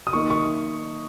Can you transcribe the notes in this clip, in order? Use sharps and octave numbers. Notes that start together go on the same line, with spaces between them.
D#6
D#3 A#3 D#4 C#6
C#6